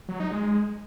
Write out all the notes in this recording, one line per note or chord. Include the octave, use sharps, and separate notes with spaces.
F#3
D#4
G#3